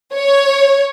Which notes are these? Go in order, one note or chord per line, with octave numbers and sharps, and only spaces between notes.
C#5